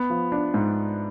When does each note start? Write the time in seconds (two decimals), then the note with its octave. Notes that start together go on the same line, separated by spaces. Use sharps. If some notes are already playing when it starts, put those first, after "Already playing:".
Already playing: B3
0.10 F3
0.32 D4
0.54 G#2